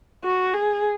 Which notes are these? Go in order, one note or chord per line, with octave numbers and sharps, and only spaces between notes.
F#4
G#4